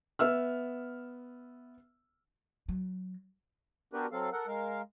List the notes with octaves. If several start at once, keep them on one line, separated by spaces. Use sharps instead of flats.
B3 E5 E6 F6
F#3
B3 D4 F#4 G4 A#4 B4
F#3 C4 A4 F5
A4 A#4 F#5
G#3 A#4 F5